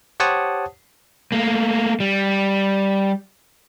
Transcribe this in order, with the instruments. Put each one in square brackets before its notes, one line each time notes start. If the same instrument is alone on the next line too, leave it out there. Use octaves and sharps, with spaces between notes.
[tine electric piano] G4 C5 C#5 F#5 A5 D#6
[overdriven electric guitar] A3 A#3
G3